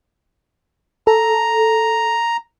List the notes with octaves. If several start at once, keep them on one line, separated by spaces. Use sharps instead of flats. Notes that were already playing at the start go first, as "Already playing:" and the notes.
A4 A#5